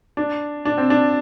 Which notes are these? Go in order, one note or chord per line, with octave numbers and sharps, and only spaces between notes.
D4
D4
C4
D4